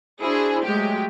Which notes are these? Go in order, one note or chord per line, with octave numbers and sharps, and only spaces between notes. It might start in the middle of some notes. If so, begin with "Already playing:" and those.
D4 E4 F#4 G#4 C5
F#3 G#3 A3 G4